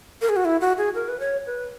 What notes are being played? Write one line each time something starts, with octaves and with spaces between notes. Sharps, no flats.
A#4
G#4
F#4
E4
F#4
G#4
A#4
B4
C#5
B4